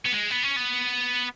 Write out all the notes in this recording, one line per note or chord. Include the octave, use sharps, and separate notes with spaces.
B3
G#3
B3
C#4
B3